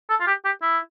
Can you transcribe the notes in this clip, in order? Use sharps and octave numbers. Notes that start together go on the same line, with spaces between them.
A4
F4
G4
G4
E4